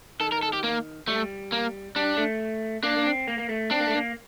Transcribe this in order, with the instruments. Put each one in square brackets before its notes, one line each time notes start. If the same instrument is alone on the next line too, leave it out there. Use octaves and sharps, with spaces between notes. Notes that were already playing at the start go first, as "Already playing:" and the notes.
[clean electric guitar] D#3 [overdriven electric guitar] A4
[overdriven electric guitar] A#4
A4
G4
A#3
[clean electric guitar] G3 [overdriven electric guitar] A3
[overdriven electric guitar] A#3
[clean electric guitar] G3 [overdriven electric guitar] D4
[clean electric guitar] A3
[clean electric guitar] A#3 [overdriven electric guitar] D4
[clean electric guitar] A#3
C4
A#3
A#3
A3
[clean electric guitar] C4 [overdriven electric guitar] D4
[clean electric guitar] A#3
A3
A#3